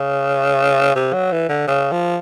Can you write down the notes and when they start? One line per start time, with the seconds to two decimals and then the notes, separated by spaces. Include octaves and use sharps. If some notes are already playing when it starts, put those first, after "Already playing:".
Already playing: C#3
0.95 C3
1.13 F#3
1.32 E3
1.49 D3
1.68 C#3
1.92 F3